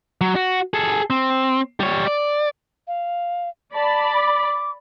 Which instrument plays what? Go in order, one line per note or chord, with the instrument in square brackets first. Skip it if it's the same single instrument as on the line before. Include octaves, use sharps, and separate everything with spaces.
[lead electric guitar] F#3
F#4
G#4 A4
C4
G3 C#5
D5
[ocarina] F5
[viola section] D5 B5 [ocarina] A5
[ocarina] D6